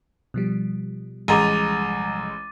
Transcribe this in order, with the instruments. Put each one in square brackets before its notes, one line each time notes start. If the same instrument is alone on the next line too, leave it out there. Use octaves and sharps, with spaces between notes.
[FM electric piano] B2 F3 G3
[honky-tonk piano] A1 G#3 A#5 [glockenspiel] D6 A6 D#7